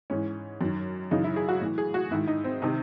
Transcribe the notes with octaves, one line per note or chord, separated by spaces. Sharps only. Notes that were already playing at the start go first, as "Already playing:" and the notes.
G#2 E3 C#4
F#2 D#3
F#2 C#3 E3 D#4
E4
G#4
F#4
A2 E3
G#4
F#4
G#2 D#3 E4
D#4
C4
C3 D#3 D#4